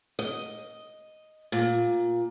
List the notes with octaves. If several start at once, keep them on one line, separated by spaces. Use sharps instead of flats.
D#5
A#2